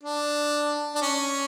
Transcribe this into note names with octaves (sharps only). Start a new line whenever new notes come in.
D4
D4
C#4